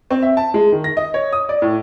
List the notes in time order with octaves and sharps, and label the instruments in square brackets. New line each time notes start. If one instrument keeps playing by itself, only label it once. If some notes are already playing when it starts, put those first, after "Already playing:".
[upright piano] C4
E5
A5
G#3
D#3
A#6
D#5
C#5
D#6
D5
A2